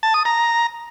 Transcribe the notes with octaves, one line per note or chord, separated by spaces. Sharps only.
A5
D#6
A#5